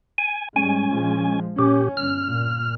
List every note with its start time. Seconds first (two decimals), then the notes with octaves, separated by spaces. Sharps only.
0.18 G#5
0.56 G#2 G3 G#3 C#4 G#5
0.89 A#1 F3 G#3
1.59 A#2 C#4 G4
1.97 G1 F6
2.27 A#2